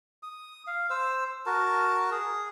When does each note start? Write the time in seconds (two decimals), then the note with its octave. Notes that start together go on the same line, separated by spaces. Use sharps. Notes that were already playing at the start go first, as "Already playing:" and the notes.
0.23 D#6
0.67 F5
0.90 C5 E6
1.46 F#4 A#4 A5
2.11 G#4